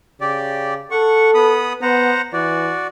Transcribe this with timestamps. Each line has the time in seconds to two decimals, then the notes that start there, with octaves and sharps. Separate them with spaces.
0.21 C#3 G4 D5
0.91 A4 F#5 C#6
1.35 B3 B5 D#6
1.82 B3 C5 F#5 A#5
2.33 E3 F#4 D5